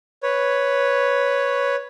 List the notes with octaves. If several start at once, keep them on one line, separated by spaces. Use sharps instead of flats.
B4 C#5